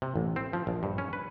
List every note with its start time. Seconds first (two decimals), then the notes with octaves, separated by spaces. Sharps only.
0.02 C3
0.16 A1
0.36 C4
0.53 F3
0.67 A#1
0.83 G2
0.98 C#4
1.13 B4